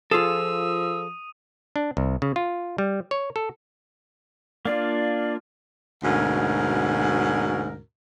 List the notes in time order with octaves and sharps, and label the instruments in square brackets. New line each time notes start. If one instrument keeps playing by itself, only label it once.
[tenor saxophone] F3 [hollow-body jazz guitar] F4 G#4 A4 [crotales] D#6 D#7 [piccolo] E6
[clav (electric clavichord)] D4
C2
C#3
F4
G3
C#5
A4
[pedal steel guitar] A#3 D4 F4 [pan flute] D5
[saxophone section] D2 G#2 B2 C#4 F#4 A#4